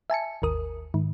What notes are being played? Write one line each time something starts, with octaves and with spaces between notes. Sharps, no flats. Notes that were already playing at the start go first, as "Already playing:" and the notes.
E5 G#5 A5 C#7
G#1 D#2 A#4 D#6
G#2 D#3